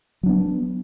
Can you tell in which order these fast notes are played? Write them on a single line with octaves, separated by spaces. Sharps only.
F#3 D4 B3